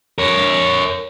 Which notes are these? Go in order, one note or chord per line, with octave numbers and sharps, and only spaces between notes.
A#4 C#5